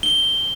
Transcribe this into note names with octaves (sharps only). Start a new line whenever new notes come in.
G7